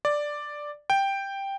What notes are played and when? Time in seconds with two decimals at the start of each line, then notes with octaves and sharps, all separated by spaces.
0.05 D5
0.90 G5